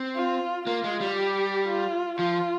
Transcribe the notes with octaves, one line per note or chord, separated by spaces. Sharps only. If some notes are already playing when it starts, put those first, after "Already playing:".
Already playing: C4
F4
A#3 F4
G#3
G3
G4
F4
F3 F4